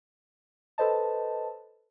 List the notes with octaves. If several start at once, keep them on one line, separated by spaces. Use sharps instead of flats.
A4 B4 C5 D#5 A5